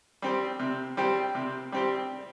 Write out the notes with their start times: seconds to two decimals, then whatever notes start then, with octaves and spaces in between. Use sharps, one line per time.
0.22 G3 C4 G4
0.59 C3
0.97 G3 C4 G4
1.35 C3
1.72 G3 C4 G4